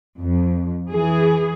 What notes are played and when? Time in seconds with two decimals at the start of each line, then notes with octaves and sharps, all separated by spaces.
0.20 F2
0.91 E3 G#4